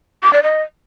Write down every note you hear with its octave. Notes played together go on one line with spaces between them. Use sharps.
D6
D5
D#5